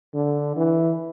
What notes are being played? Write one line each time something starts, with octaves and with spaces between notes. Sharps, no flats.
D3
E3